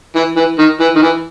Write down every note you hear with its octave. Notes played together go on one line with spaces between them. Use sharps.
E3
E3
D#3
E3
D#3
E3